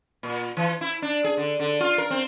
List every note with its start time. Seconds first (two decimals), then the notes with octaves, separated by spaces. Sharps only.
0.23 A#2
0.57 E3
0.81 E4
1.02 D4
1.24 G#4
1.37 D3
1.60 D3
1.80 F4
1.98 A#4
2.10 C4